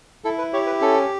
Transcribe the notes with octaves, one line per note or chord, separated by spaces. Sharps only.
E4 A4
B4
G4 C#5
B4
C#4 A4